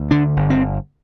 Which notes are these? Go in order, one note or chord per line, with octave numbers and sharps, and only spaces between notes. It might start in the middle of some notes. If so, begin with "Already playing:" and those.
Already playing: D2
D3 D4
G1
C4